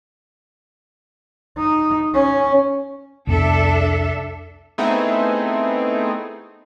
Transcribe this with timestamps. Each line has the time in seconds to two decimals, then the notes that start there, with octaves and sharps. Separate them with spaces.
1.58 D#4
2.14 C#4
3.27 C2 F2 B3 D4 A4 E5
4.78 A3 B3 C4 D#4 E4 G#4